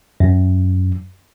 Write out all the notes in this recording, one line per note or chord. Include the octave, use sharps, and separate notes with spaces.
F#2